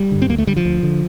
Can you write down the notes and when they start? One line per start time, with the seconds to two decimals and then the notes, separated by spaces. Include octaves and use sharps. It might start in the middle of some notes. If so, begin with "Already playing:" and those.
Already playing: G3
0.12 G2 D3
0.22 C4
0.29 D2 A#3
0.38 A3
0.47 D3 G3
0.57 F3
0.65 D2
0.83 D3